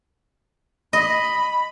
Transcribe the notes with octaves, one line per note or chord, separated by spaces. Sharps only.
D#5 B5